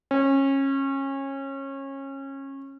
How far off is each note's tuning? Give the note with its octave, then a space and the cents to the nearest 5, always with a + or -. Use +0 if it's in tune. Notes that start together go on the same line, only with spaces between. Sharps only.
C#4 -25